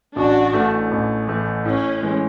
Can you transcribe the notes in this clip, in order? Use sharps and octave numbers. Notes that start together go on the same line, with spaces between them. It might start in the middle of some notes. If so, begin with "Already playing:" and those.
A1 D4 F#4
A2 E3 A3
A1
A2 E3 A3
A2 C#4
E3 G#3